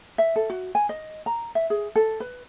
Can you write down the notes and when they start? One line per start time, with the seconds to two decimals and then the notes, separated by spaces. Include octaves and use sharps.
0.18 E5
0.36 A4
0.50 F#4
0.75 G#5
0.89 D#5
1.26 A#5
1.55 E5
1.70 G#4
1.96 A4
2.20 B4